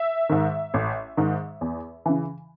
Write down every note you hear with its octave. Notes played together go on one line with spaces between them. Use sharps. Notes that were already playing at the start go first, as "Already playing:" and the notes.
Already playing: E5
G#2 D#3
A1
G#2 D#3
E2
C#3 E3